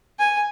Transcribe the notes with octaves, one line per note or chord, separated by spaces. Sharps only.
G#5